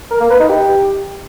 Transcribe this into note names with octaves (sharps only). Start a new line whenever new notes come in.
A#4
A#3
B4
D#4
G4